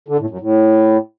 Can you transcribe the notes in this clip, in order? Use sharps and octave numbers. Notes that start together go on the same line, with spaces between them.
D3
A2
F#2
A2